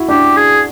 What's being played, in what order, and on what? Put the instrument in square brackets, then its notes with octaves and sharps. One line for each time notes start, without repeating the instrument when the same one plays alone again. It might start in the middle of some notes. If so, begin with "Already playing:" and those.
Already playing: [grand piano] E4 F#4
[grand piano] D4 [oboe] G4
[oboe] G#4